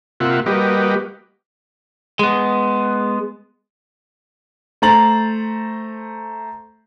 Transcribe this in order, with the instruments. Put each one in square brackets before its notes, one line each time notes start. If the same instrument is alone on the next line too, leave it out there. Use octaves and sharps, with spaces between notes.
[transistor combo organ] C3 A#3 F4 E5 F#5
G3 A#3 F#4 G4 B4 D#5
[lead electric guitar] G#3 B3
[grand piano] A3 C5 A#5 A6 F#7